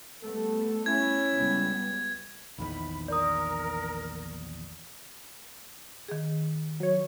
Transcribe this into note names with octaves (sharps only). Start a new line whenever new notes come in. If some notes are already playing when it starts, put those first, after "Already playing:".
G3 A3 B3 A4
C#4 E4 G#6
C#2 G3 B3
A#1 E2 D#3 B5
A#4 D5 D#6
D#3 G#4
F#3 C#5